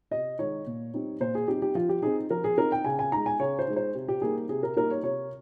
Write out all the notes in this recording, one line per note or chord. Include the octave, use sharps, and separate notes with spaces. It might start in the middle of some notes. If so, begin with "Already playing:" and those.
C3 D#5
D#3 G#3 D#4 C#5
A#2
G3 C4 D#4
A#2 C5
G#4
G3 C4 D#4 G4
G4
F3 F4
G4
C4 D#4 G#4
F3 A#4
G#4
C4 D#4 A#4
G5
C#3 G#5
G#5
G#3 D#4 A#5
G#5
C#3 C#5
C5
G#3 D#4
C5
C3
G4
G3 A#3 D#4 G#4
C3 G#4
A#4
G3 A#3 D#4 A#4
C#5
C3 C#5